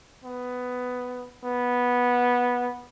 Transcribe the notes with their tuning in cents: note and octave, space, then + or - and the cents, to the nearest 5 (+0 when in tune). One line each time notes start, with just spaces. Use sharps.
B3 +10
B3 -10